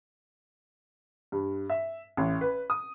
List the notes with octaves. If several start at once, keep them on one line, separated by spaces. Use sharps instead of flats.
G2
E5
A1
B4
D#6